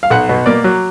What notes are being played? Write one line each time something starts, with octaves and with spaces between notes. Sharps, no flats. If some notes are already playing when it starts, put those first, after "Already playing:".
F5
B1 F#5
B2
A#3 D5
F#3